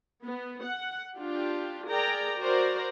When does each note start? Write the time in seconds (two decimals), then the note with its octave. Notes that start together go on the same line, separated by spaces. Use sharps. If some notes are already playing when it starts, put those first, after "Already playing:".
0.24 B3
0.63 F#5
1.18 D4 F4 G4
1.89 G#4 A#4 D5 G5 A#5
2.39 F#4 A#4 C5 D5 A#5